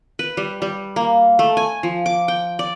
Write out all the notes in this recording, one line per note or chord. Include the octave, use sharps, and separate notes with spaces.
B4
G3
G3
A#3
A3
G#5
F3
D6
G5
D5